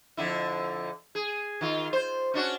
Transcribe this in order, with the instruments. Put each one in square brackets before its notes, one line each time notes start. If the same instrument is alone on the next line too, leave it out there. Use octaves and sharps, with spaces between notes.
[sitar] F2 D3 E4
G#4
D#3 F4
C5
C#4 D4 F#4